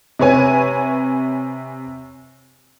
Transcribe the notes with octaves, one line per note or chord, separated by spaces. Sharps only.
C3 B4 C#5 G#5